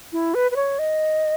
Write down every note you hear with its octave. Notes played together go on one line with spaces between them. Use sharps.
E4
B4
B4
C#5
D#5